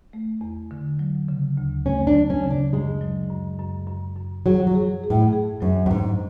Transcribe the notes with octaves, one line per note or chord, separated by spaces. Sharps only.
A3
E2
D3
F#3
C#3
D2
A3 C#4
D4
F#3
C#4
C#3
D4
F#2 G#3
F#3
F#2
F#2
F#2
F#2
F#3 G#4
F#3
G#4
G#4
A2
G#4
F#2 F#3
F#2
G#2 C#4